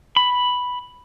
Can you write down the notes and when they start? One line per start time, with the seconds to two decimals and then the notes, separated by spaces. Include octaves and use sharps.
0.17 B5